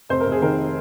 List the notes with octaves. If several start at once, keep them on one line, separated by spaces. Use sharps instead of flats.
F1 C5
A#4
F1
G#4
D#3 A#4